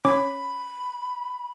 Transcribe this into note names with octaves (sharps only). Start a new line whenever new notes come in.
C#4 C#5 B5 D6